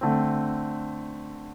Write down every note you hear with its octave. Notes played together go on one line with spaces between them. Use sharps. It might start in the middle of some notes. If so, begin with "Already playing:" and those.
D3 A3 C4